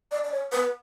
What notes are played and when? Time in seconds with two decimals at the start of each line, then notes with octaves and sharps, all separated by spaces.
0.12 D5
0.24 D5
0.32 C#5
0.52 B4